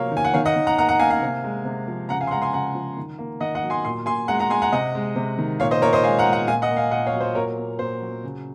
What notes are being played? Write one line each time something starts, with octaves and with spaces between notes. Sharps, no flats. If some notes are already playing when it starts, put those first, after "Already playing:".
Already playing: C3 F3 F#3 A#3 C#5 F5
D#3
G#5
F#5
D#3 C#5 F5
D#5 F#5
D#3
F#5 A#5
A#3 F#5 A#5
F#5 A#5
A#3 F5 G#5
F5 G#5
C3
G#3
C3
F3
C#3 F#5 A#5
F5 G#5
C6
G#3 F#5 A#5
G#5 C6
C#3 F#5 A#5
F3
D#3
A#3
D#3 D#5 F#5
D#5 F#5
F#3
G#5 C6
A#2 C6
A#2 G#5 C6
G#3 F#5 A#5
F#5 A#5
G#3 G#5 C6
F#5 A#5
C3 D#5 F#5
G#3
C3
D#3
A#2 C#5 F5
C5 D#5
A#2 A#4 C#5
C5 D#5
G#3 F5 G#5
F#5 A#5
G#3
F#5 A#5
A#2 F5 G#5
D#5 F#5
A#3
F5 G#5
A#2 D#5 F#5
C#5 F5
F#3
C5
A#2 A#4 C#5
A#3
A#2 C5
F#3
C#3